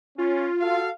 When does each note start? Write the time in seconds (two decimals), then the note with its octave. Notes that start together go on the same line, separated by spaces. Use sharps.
0.18 C#4 F4
0.61 F#4 A4 F5